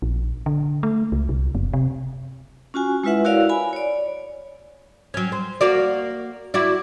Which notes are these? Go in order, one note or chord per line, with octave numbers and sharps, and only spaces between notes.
A#1
D3
A3
C#2
C2
F#1
C3
C#4 F4 F#4 G#5
G#3 E4 F4 B4 E5 F#5
E4 F#4 A#4 C#5 D5 F5
G#5 B5
C#5 D5
F#3 C#4
C5
A#3 F#4 D5
E4 F#4 D5